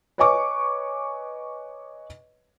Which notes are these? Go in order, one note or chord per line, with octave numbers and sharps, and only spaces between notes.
B4 C#5 D#5 G#5 C#6 D6